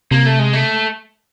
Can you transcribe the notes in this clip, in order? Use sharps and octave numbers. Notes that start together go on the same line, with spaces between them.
C3 A#3
A3
G#3
A3